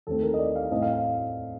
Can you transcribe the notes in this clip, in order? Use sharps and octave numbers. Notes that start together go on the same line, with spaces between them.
D#2 D#3 A3 C4 A4
A#4
D#5
D5
F5
A2 A3 C4 D#5
F5
F5